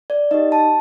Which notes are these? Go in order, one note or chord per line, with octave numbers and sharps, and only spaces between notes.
D5
D#4 G4 D#5
A5